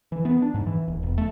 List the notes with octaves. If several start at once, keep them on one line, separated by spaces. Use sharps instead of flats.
E3
B3
D4
G#2
E3
D#1
E1
A3